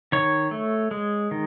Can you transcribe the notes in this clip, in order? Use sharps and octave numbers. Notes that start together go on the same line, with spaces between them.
D#3 C#5 C#6
A3
G#3
D#3